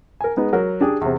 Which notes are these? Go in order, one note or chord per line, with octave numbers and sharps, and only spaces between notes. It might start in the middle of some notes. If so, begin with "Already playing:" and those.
A#4 G#5
G#3 B3 D#4
F#3 A#4
D4 G4 G#4
E2 C3